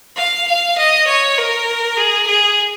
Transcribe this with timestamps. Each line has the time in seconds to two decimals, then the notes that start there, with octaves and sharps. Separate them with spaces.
0.17 F5
0.48 F5
0.78 D#5
1.07 C#5
1.37 A#4
1.96 G#4
2.27 G#4